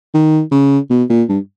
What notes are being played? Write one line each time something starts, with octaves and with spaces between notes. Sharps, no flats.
D#3
C#3
B2
A#2
G2